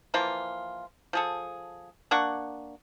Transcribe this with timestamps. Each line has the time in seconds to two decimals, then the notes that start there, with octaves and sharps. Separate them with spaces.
0.14 E3 F3 A#3 F4
1.13 F3 G#4 A4
2.11 A#3 D4 F#5 C#6